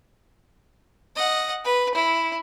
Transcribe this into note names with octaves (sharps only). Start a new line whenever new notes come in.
D#5 F#5
B4
E4